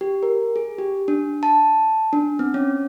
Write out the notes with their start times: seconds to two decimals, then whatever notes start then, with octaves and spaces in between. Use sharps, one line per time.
0.01 G4
0.23 A#4
0.56 G#4
0.78 G4
1.08 D4
1.43 A5
2.13 D4
2.39 C4
2.54 C#4